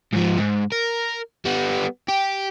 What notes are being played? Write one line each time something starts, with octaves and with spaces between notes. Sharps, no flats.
G#2 F3
G#2
A#4
G3 B3
G4